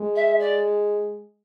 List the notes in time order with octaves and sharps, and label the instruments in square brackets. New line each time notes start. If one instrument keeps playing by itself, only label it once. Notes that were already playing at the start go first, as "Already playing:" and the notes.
Already playing: [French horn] G#3
[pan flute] E5
D5